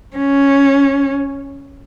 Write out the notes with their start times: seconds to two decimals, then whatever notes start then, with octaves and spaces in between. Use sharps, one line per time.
0.16 C#4